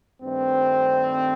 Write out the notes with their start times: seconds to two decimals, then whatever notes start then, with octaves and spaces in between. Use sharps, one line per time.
0.22 G2 D#3 A3 C4